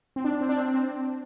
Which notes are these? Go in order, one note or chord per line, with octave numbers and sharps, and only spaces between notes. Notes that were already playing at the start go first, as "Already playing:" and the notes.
C4
D4
C4
D4
C4
C4